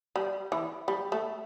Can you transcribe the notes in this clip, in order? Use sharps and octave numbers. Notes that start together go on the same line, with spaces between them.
G3
E3
G3
A3